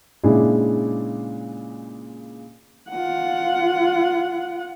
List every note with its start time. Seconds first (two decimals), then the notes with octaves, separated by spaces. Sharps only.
0.24 A#2 C#3 G#3 D4 E4 G#4
2.90 F4 F#5